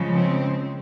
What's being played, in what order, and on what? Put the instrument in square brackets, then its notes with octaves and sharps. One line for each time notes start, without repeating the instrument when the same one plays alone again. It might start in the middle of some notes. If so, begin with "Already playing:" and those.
Already playing: [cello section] C#3 F3 G#3
C4